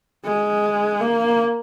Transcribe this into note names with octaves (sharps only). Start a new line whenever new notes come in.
G#3
A#3